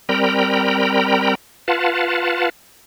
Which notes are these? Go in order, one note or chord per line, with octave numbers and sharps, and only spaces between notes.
G3 C4 A#4 G5 A#5 B5
F4 B4 F5 F#5 A5